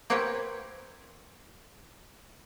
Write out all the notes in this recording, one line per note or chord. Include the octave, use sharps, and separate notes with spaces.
A#3 C4 F#4 G4 B4 C#5